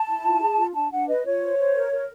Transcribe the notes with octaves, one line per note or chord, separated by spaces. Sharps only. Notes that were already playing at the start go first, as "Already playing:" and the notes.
Already playing: A5
E4
F4
G#4
F4
D4 A5
D4 F#5
B4 D#5
F4 C#5
C5
C5
A#4
A#4